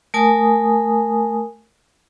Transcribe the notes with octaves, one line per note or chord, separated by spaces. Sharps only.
A3 A#4 G#5 A5 D#6